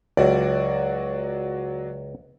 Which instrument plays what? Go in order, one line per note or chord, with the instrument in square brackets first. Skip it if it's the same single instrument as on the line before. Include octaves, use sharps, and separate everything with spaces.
[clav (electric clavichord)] C#2 [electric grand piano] F#3 F#4 D5